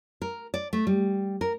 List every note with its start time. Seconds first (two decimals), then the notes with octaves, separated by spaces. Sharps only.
0.22 A#4
0.54 D5
0.73 A3
0.87 G3
1.41 A#4